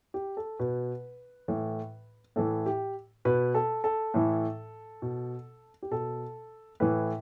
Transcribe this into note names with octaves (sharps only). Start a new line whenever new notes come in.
G4
A4
B2 B4
A2 E3
A2 E3 A4
G4
B2 B4
A4
A4
A2 E3
B2
G4
B2 A4
A2 E3 B4